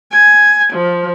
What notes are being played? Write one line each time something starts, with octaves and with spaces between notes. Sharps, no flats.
G#5
F3